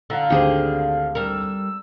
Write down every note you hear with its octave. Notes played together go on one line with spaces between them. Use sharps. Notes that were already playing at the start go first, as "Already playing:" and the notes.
D3 F5 F#5 A#5 E6
G#1 D2 G4 G#4 C5
G3 A#4 E6